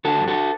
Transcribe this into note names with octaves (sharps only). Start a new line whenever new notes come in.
D3 F#4 A4
G2
F#4 A4